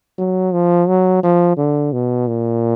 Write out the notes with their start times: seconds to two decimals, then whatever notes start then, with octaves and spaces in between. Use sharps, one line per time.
0.18 F#3
0.53 F3
0.88 F#3
1.23 F3
1.57 D3
1.93 B2
2.27 A#2